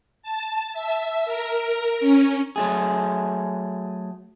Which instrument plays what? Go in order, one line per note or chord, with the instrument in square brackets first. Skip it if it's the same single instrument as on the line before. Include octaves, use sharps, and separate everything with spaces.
[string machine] A5
E5
A#4
C#4
[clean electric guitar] F#3 A3 G#4